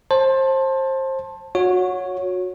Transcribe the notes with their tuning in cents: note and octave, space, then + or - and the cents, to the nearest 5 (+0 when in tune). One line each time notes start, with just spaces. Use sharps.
C5 +25 A5 +5
F#4 -25 C#5 +0